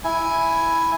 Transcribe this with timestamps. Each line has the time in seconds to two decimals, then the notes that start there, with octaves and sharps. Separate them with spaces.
0.04 E4 G#5